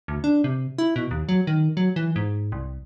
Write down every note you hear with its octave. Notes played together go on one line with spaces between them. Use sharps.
D2
D4
C3
E4
B2
D#2
F#3
D#3
F#3
E3
G#2
C2